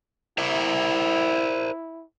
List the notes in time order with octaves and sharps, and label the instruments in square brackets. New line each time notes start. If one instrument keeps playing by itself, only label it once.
[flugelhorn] E4 [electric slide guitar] A#4 C5 E5